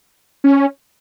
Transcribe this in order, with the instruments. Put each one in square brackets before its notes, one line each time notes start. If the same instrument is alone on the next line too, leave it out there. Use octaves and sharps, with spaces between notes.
[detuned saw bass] C#4